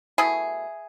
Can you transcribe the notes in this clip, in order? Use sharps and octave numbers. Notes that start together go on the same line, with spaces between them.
B2 A3 E4 G#4